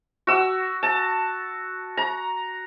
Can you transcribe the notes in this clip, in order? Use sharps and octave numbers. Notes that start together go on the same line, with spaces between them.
F#4 E6
A5
A#5